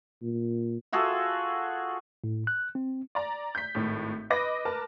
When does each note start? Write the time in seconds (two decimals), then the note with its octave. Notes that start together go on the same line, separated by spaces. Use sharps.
0.23 A#2
0.92 F4 F#4 G#4 A4
2.24 A2
2.47 F#6
2.75 C4
3.15 D5 A#5
3.55 G6 B6
3.75 G#1 A2
4.30 B4 D#5 B5 D6 A#6
4.65 A#4 B4 A5